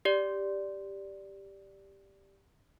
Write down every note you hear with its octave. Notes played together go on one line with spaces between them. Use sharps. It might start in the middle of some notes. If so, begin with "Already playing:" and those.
G4 D5